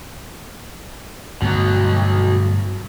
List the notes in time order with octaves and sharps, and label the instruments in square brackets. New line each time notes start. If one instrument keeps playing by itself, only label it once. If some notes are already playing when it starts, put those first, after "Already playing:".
[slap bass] G2 D3 A3 [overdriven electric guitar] B2 F#3